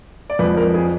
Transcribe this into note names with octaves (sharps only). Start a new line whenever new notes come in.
D5
F2 F3 G#3 B4
A#4
G#4